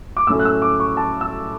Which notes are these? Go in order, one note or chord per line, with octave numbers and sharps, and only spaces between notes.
D6
A2 F#3 A3 C#4 E6
F#6
E6
D6
C#6
A5
E6